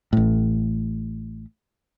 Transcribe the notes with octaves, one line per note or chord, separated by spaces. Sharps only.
A1 A2